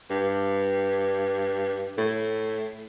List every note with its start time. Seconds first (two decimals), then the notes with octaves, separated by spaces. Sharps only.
0.10 G2
1.98 A2